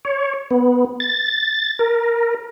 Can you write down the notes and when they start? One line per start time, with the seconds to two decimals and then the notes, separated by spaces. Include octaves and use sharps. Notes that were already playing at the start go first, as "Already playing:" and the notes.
0.05 C#5
0.51 B3
1.00 A6
1.79 A#4